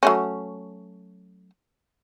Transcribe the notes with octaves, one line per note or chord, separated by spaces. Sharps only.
F#3 A3 C#4